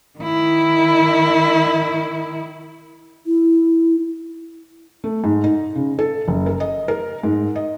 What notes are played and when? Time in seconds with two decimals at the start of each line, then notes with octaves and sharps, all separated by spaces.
0.19 D#3 E4
3.26 E4
5.04 A3
5.24 G#2
5.44 D#4
5.75 C#3
5.99 A4
6.28 F#1
6.46 A#4
6.60 D#5
6.88 A#4
7.23 G#2
7.56 D#5